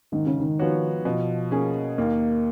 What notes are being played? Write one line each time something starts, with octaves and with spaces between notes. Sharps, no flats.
G#2 D#3
C#3
D#3
F3 B3 F#4 C#5
B2 F3
A#3 C#4 G#4
D#2 A#3